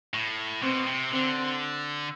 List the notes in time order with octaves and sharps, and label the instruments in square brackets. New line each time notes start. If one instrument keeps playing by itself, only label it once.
[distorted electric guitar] A2
[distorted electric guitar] B2 [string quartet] C4
[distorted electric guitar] C3
[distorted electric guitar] D3 [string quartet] C4